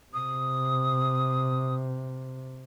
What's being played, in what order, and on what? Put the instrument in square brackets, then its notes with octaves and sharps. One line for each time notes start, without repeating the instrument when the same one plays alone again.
[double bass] C3 [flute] D#6